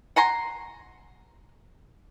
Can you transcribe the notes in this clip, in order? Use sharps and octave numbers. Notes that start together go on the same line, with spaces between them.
F#5 G#5 A#5 C6